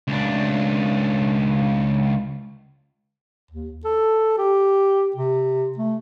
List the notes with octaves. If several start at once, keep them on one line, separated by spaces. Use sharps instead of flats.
C#2 D4
D#2
A4
G4
C3
A3